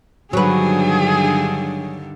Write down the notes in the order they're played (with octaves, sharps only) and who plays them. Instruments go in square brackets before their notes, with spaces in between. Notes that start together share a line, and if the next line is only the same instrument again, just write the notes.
[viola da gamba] G2 D3 D#3 [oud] F#3 B4 [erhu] G#4